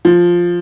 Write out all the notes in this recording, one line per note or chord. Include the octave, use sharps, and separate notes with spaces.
F3